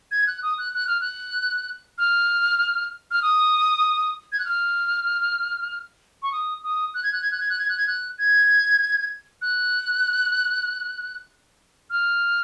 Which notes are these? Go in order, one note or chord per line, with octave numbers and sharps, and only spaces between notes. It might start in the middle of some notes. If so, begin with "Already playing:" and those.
G#6
F#6
D#6
F#6
F#6
F6
F#6
F6
F6
D#6
G#6
F#6
F6
C#6
D#6
D#6
F#6
G#6
F#6
G#6
F#6
G#6
F#6
G#6
F#6
G#6
F#6
G#6
F#6
F6